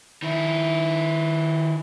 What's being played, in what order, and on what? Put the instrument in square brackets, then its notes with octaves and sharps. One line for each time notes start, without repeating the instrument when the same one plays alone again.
[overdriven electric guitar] D#3 E4